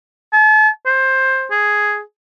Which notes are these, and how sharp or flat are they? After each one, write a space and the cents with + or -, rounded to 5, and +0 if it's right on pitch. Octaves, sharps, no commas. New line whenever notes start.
A5 -40
C5 +15
G#4 +5